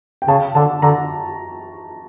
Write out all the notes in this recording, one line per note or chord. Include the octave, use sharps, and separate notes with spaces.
G5
C#3 A5
D3 A5
D3 A#5